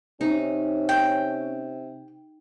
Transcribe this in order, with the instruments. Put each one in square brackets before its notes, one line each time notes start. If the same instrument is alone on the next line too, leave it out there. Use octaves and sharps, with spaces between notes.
[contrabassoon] C3 [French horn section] C#4 [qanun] D#4
[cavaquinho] G5